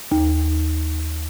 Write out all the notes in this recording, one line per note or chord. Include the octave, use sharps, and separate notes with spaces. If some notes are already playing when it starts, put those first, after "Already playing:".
D#2